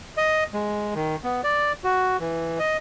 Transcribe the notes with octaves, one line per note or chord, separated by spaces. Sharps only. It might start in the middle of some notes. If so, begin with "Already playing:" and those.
D#5
G#3
D#3
B3
D5
F#4
E3
D#5